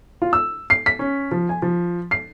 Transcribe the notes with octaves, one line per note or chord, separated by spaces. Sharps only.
F4
E6
C7
B6
C#4
F3
G#5
F3
C7